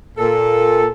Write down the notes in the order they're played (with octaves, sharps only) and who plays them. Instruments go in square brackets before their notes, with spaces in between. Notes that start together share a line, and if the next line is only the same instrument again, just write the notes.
[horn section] A#2 A4